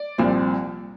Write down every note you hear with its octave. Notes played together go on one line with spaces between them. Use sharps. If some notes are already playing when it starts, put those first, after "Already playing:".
Already playing: D5
C2 A#2 F3 C4